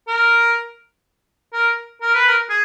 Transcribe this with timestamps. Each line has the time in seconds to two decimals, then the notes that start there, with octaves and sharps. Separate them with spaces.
0.07 A#4
1.53 A#4
2.02 A#4
2.14 B4
2.28 A#4
2.50 G#4